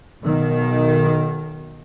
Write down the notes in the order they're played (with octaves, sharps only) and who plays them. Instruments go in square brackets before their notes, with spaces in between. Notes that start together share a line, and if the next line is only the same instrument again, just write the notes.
[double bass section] B1 D#3